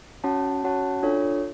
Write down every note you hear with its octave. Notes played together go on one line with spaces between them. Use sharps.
C#4 F#4 C#5 F#5 A5
C#4 F#4 C#5 F#5 A5
D4 F4 A4 C#5